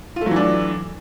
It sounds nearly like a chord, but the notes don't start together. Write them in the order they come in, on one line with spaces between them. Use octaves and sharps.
F4 A3 F#3 E3 D4